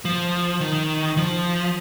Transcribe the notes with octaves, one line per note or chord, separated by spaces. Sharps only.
F3
D#3
F3